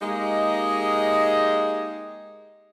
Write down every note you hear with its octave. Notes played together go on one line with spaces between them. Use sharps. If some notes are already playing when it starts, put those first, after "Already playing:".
G#3 A#3 D#4 G4 G#4 D#5